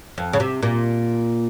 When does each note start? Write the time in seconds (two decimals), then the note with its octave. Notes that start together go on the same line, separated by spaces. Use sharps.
0.18 F2
0.33 C#3
0.40 C3
0.63 A#2